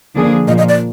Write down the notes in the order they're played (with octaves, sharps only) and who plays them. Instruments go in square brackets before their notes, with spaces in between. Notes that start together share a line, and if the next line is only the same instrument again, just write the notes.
[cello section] D3 F3 A#3 D4 G#4
[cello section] A#2 F3 A#3 [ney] D#5
[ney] D#5
D5